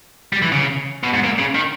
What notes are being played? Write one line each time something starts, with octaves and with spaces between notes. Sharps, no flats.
G3
E3
C#3
B2
G#2
A#2
C#3
D#3